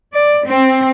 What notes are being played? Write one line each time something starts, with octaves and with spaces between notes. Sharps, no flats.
D5
C4